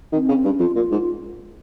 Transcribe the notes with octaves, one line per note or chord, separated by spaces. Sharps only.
D#3 C4
C#3
G2 C#4
F2 F4
A#2 F4
G#2